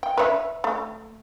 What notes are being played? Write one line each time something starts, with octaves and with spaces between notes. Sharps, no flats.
G5
B4 C#5 E5
A3